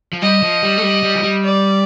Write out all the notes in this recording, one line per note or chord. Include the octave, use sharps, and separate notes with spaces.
F3
G3 D#5
F3
G3
A3
G3
G3
F3
G3
D5